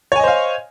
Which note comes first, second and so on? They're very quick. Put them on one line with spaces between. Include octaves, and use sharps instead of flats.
C#5 G#5 D#5 C5 F5